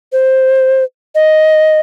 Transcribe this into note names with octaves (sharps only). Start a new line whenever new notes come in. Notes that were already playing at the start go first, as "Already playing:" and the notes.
C5
D#5